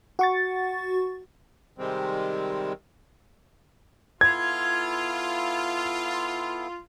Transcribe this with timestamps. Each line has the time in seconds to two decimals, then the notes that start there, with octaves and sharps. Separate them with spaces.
0.19 F#4 C#6 A6
1.78 C3 D#3 G3 G#3 C4
4.21 B3 E4 F4 A4 G#6